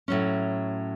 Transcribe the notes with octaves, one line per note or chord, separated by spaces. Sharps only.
A2 F#3 C#4